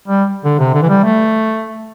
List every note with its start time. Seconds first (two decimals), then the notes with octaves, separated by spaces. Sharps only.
0.08 G3
0.44 D3
0.59 C3
0.74 D3
0.82 E3
0.89 G3
1.04 A3